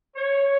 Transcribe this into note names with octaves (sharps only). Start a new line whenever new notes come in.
C#5